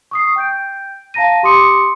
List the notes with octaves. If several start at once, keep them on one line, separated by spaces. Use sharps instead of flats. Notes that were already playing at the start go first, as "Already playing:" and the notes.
C#6 D#6 C7
G5 G6 D7
F5 A5 A#5 A#6 D#7
G4 C6 D6 D#6 C#7